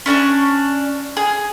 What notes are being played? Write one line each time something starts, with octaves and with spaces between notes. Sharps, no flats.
C#4 D4 A#5 C#6
G#4